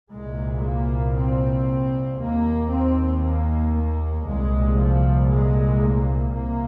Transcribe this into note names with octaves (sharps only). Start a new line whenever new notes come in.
C2 A#2 G#3
A#3
C4
D#2 A#3
C4
A#3
A#3
C2 A#2 G#3
F3
G#3
A#3
C2 C3 A#3